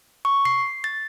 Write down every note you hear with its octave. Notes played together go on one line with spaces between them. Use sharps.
C#6
C7
A6